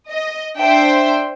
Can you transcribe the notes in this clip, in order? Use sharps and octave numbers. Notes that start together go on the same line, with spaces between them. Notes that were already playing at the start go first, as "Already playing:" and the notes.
D#5
D4 C5 E5 G5